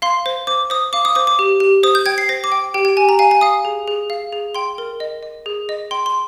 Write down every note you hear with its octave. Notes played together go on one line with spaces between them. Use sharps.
F5 C6
C5
C5 D6
C5 D#6
F5 D6
D#6
C5 D6
D6
G4
G4
C5 D#6
G6
G5 G#6
C7
C5 A#6
D6
G5
G4 G5
G5
G4 G#5
A#5
F5 G#5
G#5
F5 D#6
G#4
G#4
F5
G#4
G5 C6
A#4
D#5
D#5
G#4
D#5
G5 C6
C6